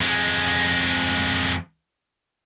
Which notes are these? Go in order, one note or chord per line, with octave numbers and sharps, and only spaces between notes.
F2 G#3